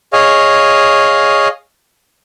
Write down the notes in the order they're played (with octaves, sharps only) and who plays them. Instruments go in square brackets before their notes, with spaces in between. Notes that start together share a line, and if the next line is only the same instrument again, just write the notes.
[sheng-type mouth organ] G#4 C#5 D#5 F5